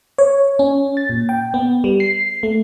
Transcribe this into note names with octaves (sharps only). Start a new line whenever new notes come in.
C#5
C#4
A6
A#2
G5
B3
G3
C7
A3